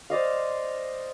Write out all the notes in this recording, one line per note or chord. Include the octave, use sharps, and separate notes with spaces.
C5 D5 D#5 F5